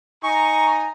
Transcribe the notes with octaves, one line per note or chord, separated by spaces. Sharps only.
D#4 G#5 A#5 C#6